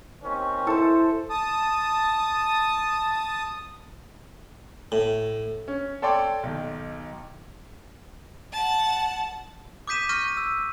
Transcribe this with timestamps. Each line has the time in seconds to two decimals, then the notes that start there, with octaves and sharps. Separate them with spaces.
0.23 D#2 C4 C#4
0.67 E4 A4 C5
1.30 A5 D#6
4.92 A2
5.68 C#4
6.02 A4 C#5 D5 G5 C6 D6
6.43 B1 D#3
8.53 F#5 A5
9.87 D6 D#6 G6 B6 D#7 E7
10.09 C#6 F6 G6 A#6 D#7
10.37 E6